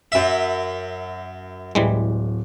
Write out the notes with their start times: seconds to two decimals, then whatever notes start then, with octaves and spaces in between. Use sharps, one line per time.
0.12 F#2 E5
1.75 D1 E3 G3 G#3